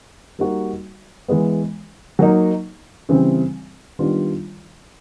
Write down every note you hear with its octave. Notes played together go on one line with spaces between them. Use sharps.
G3 A#3 D#4 F#4
E3 G#3 B3
F#3 A#3 D#4
C#3 E3 G3 C4
D#3 G3 B3 D4 F4